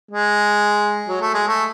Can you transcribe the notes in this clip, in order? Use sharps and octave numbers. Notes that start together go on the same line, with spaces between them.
G#3
F#3
A3
G#3
A3